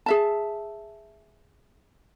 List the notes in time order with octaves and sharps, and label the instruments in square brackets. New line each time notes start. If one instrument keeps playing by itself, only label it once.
[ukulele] G#4 E5 A5